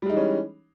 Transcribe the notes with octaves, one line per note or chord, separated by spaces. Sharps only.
E3 G3 G#3 C#4 D#4